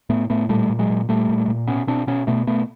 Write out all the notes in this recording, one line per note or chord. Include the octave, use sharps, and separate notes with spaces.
A2 A3 B3
A2 A3 B3
A#2 G3 A3
A#2
F#3 G#3
A#2
A#2 G3 A3
A#2
A#2
B2 B3 C#4
B2 C4 D4
B2 B3 C#4
B2 A3 B3
B2 A3 B3